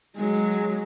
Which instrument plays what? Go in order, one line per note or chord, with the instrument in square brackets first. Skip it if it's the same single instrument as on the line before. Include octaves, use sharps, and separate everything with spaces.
[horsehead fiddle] F#3 G#3